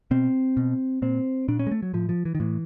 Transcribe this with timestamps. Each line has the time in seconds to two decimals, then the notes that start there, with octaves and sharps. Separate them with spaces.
0.11 B2 C4
0.57 B2
1.02 A#2 C4
1.48 A#2 D4
1.59 C#4
1.67 G#3
1.71 A3
1.82 F#3
1.93 A2 F3
2.09 F3
2.25 E3
2.35 D#3
2.40 A2 E3